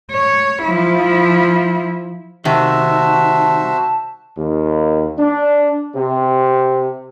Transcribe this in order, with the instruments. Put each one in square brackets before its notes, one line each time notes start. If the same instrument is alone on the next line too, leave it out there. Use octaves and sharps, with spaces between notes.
[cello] C#5
F3 E4
[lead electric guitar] C2 D#3 [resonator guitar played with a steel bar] C3 [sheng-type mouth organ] F#4 C5 E5 [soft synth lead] A5
[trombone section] D#2
D4
C3